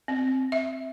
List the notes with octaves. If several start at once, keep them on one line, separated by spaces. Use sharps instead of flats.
C4
E5